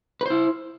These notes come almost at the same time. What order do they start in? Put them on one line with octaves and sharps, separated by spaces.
B4 C5 E4